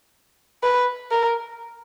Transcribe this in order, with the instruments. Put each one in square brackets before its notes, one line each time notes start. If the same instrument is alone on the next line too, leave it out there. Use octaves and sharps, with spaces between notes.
[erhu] B4
A#4